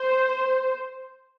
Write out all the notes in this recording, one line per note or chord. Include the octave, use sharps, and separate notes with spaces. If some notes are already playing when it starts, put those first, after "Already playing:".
Already playing: C5